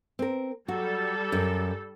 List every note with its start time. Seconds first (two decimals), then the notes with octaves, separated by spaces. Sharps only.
0.19 C4 A#4
0.68 F#3 G3 F#4 A4
1.32 F#2